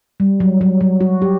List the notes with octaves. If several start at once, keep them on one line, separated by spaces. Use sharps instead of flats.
G3
F#3
F#3
F#3
F#4
G4